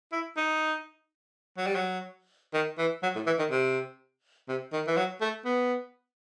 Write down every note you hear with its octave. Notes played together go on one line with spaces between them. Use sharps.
E4
D#4
F#3
G3
F#3
D#3
E3
F#3
A2
E3
D#3
C3
C3
D#3
E3
F#3
A3
B3